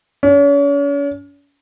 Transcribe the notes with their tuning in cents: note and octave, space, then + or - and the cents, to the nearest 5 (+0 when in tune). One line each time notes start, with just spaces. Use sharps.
C#4 +40